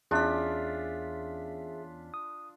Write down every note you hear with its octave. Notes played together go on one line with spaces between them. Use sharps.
E2 C#4 D4 F4 G#4 E5 E6 B6
D#6